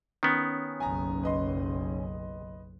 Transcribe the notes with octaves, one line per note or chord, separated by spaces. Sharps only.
D#3 B3 C#4
F#1 B1 G#5 A#5
B4 D#5 C6